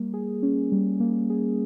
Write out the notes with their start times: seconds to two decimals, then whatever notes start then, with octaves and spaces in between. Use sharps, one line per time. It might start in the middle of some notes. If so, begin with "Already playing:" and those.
Already playing: G3 A#3
0.14 G#4
0.43 C#4
0.72 G3
1.00 A#3
1.30 G#4